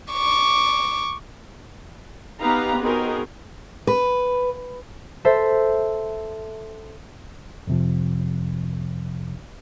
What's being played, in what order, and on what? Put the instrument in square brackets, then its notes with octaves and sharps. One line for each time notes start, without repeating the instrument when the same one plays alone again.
[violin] C#6 D6
[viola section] B3 D#4 G4 B4 F5 A#5
B3 C4 D#4 F#4 G#4 A#4
[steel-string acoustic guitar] B4
[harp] A4 C5 E5
[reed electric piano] F2 C3 F3